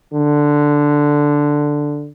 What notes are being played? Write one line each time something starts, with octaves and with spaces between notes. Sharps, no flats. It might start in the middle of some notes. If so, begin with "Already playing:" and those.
D3